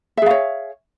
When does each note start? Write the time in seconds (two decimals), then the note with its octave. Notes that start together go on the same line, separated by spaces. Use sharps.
0.17 E5
0.22 G#4
0.26 F5
0.31 C#5